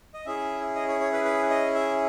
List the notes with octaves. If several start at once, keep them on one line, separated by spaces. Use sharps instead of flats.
D#5
C#4 E4 G#4 E5
D#5
C#5
C#5
B4
B4
D#5
E5